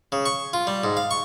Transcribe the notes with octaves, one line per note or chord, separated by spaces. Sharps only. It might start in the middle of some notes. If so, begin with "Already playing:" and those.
C#3
C#6
F4
G3
G#2
F5
C#6